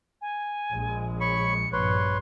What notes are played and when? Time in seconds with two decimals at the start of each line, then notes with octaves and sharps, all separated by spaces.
0.21 G#5
0.72 A#1 G#3
1.21 C#5 B5 C#6 C#7
1.73 A#1 G2 B4 C#5 C6